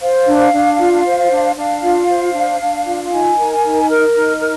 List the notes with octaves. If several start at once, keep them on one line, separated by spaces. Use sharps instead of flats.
C5 F5
D4
D4
F4
C5
D4
D4 F5
F4
C5
D4
D4
F4
D#4 G#5
A#4
D#4
A#4 F6
D#4
A#4